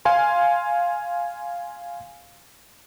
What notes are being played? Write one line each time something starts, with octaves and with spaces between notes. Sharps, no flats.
F5 G#5 C6